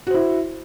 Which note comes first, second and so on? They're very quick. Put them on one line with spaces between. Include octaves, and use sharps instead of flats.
F#4 C5 E4